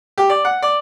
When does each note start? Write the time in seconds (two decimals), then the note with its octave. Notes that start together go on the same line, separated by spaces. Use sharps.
0.18 G4
0.30 D5
0.45 F#5
0.62 D5